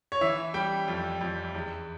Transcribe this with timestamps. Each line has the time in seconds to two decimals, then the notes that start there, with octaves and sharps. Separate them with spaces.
0.12 C#5
0.21 E3 E5
0.54 G3 G5
0.88 F2
1.21 F2
1.54 E2